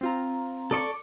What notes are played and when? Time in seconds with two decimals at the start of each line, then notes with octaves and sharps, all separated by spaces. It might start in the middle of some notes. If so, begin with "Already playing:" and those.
0.01 C4 F4 A#5
0.71 A4 D5 C#6